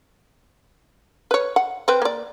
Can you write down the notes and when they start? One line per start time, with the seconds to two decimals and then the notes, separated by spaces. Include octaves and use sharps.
1.31 B4 C#5
1.56 F#5
1.88 C4 B4
2.02 A#3 D5